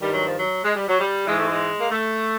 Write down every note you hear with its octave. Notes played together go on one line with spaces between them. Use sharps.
G2 D#3 G3
F#3
F3
F#3
G#3
G3
F#3
G3
G#2 E3 G#3
A3
G#3
A#3
A3